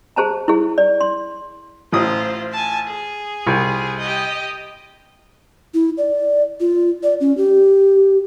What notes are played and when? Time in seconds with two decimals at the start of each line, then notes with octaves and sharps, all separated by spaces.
0.16 G#4 C5 A5 A#5
0.48 E4 G#4
0.78 D5
1.01 C6
1.92 A1 F4 C5 D#6
2.52 G#5 A5
2.87 G#4
3.46 C2
3.99 G4 D#5
5.74 E4
5.97 D5
6.60 F4
7.03 D5
7.20 C#4
7.37 G4